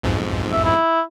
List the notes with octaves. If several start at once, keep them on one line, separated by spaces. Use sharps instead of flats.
B1 F2 G#2
E5
E4